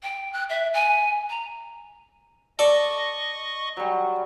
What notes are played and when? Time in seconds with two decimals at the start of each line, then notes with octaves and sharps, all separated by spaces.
0.03 G5
0.33 F#6
0.49 E5
0.73 G#5
1.29 A#5
2.59 A4 D5 D#5 C#6
3.77 F#3 G3